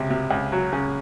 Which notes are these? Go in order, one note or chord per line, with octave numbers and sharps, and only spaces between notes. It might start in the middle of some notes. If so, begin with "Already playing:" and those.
Already playing: C#2 C3
C3
C#2
F#3
C#3